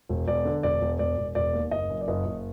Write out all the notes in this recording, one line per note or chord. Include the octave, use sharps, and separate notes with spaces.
E1
E1 D5
D3
E1 D5
E1
E1 D5
E1
E1 D5
D#2
F#1 D#5
F#2
D5
F#1 D#5
F#1